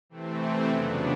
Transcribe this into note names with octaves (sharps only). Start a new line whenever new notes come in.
C3 E3 A3 C4
F2 C#3 F#3 B3 D4